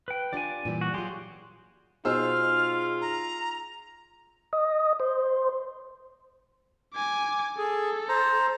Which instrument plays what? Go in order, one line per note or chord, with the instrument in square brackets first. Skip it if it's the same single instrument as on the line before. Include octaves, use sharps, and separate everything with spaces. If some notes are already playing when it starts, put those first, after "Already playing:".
[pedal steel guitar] B4 G5
[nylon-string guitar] D4 F4 G4 [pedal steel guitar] D5 G#5
[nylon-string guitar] A#2 E3 G3
[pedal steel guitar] F#4
[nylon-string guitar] F#3 F4 [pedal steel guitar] G4 G#4 C6
[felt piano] B2 C5 E6 [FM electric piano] D#4 G#4 [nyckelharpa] F4 [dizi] F6
[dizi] A#5
[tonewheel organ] D#5
C5
[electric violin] G#5 D6
[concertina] G#4 [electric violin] A4
[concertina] C5 A#5